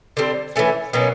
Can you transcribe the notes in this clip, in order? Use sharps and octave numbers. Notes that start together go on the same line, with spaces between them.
D3 G3 C4
E3 A3 C#4
B2 F#3 A#3 C#4